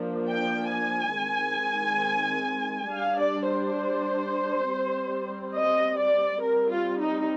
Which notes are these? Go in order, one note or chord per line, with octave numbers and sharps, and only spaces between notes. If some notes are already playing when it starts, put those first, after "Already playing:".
Already playing: F3 A#3 D4
G5
G#5
D#3 G#3 C4
G3 D4 F5
D5
C5
G3 C4
D#5
D5
G3 C4 A#4
F4
D#4